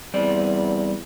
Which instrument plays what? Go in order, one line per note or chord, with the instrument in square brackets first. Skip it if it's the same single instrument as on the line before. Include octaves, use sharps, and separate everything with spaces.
[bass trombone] E2 [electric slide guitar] G3 C4 D5